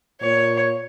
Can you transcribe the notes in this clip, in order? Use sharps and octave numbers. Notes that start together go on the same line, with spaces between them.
A#2 C#5